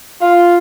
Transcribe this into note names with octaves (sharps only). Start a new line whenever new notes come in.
F4